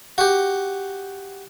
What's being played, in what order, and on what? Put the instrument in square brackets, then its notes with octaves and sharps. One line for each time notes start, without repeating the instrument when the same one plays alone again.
[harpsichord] F#4 G4